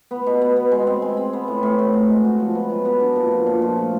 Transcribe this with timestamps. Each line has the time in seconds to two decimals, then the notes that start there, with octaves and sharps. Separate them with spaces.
0.11 B3
0.26 B2
0.41 B3
0.56 B3
0.72 G#3
0.87 C4
1.02 G#3
1.17 C4
1.33 B3
1.48 A2
1.63 A2
1.79 A2
1.93 F#4
2.09 G#3
2.24 F#4
2.40 F3
2.55 B3
2.70 F#3
2.85 B3
3.00 D4
3.16 A#2
3.31 F3
3.46 A#2
3.62 F3
3.77 A3